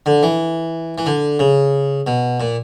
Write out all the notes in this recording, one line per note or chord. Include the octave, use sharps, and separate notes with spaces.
D3
E3
E3
D3
C#3
B2
A#2